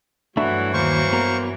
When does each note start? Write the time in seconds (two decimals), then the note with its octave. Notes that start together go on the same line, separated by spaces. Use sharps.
0.37 G2 E3 F#3 A3 D4 E4 F#4
0.74 D#2 A#3 C5 C#6
1.13 B3 A#4